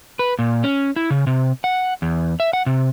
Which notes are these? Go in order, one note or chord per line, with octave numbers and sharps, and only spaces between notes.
B4
A#2
C#4
E4
C#3
C3
F#5
E2
E5
F#5
C3